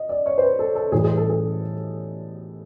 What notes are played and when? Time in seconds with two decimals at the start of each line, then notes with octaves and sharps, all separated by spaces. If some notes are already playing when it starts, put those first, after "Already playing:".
Already playing: D#5
0.09 D5
0.26 C#5
0.38 C5
0.42 B4
0.59 A4
0.75 A4
0.92 A2 E3 G3 G#4
1.04 G#4
1.17 A4
1.29 G#4